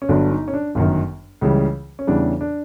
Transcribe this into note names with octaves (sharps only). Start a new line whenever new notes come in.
C#4
G1 G2 D3 F#3 D4
D#4
C#4
D4
G1 F#2 D#3
C#2 C#3 E3 G3
C#4
E2 C#3 E3 G3 D4
D4